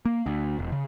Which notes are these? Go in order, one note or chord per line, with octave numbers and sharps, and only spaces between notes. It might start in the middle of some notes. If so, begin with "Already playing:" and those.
A#3
D2
E1
C#3